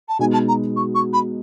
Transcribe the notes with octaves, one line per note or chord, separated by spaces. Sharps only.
A5
B2 G#3 B3 D#4 G#5
A5
A#5
C#6
C#6
B5